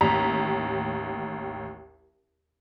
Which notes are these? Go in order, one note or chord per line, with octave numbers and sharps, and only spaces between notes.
A1 D#2 A#5 B6